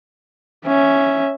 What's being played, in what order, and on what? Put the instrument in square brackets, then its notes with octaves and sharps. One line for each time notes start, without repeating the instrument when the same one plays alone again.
[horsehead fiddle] C#4 E5